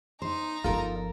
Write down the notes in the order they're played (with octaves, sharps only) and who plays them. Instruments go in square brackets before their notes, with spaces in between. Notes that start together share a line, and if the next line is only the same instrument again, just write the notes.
[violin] D#4 A#5 [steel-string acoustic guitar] C5
[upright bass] G1 F3 [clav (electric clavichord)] F4 [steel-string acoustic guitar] A4 A#4